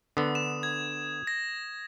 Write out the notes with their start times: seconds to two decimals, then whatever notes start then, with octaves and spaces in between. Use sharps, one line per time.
0.17 D3 B3 D#6
0.35 E7
0.63 G#6
1.27 A#6